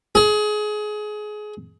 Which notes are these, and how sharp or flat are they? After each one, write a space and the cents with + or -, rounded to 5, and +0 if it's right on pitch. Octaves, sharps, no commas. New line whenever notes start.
G#4 +25